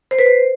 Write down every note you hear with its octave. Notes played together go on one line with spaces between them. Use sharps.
C5
B4
C5